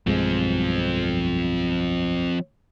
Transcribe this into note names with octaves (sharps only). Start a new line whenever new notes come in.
B1 G2 F3 G#3 C4